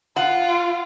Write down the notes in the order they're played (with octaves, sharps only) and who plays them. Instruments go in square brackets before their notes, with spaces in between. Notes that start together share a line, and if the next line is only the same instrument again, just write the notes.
[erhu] F4 [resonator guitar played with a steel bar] F#5